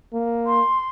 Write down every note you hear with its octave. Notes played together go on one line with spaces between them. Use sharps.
A#3
C6